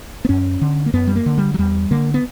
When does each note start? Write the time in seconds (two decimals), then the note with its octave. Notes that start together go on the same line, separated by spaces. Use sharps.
0.25 B3
0.29 F#2 C#4
0.61 D3
0.86 A#3
0.93 F#2 B3
1.07 G3
1.15 A#3
1.26 D3
1.38 G3
1.54 F#3
1.58 E2 G3
1.91 D3 A#3
2.14 B3